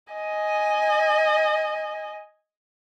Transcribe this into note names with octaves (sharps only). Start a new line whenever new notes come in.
D#5 G#5